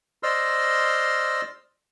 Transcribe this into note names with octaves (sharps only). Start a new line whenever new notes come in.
C5 D5 D#5 C6 E6 F6